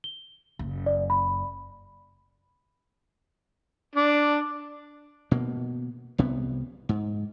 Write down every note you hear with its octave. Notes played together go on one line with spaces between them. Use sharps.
G7
F#1
D5
B5
D4
B2 A#3
C2 C3 B3
G#2